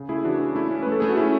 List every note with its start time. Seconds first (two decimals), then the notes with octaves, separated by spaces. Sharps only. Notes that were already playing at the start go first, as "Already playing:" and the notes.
Already playing: C#3
0.09 A3 E4 G#4
0.24 E3 D4 F#4
0.40 C#4
0.55 A3 E4
0.71 C#4
0.83 B4
0.86 A3
0.92 A4
1.00 A3 G#4
1.09 F#4
1.17 C#4 E4